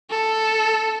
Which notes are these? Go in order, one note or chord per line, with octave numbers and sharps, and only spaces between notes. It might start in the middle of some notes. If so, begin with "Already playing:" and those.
A4